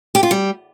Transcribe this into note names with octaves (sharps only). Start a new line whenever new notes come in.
G4
F4
G3